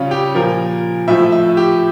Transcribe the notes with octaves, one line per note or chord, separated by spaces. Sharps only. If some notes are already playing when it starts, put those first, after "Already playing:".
Already playing: C#3 G3 C#4 F4
G4
A#2 F3 A#4
A2 F3 E5
E5
G4